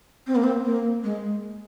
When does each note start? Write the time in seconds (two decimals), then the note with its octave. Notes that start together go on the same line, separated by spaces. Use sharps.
0.27 C4
0.35 A#3
0.44 C4
0.65 A#3
1.04 G#3